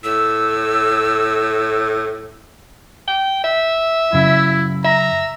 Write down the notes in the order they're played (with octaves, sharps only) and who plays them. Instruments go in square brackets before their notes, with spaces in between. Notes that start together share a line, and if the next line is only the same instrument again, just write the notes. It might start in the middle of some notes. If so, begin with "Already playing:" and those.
[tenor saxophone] A2 [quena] E6
[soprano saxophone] G5
E5
[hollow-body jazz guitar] F#2 C#3 [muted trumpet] E4
[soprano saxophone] E5 [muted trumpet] A#5